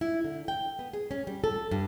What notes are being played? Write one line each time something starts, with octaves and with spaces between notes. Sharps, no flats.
E4
D3
G5
B3
G#4
C#4
G3
A4
G2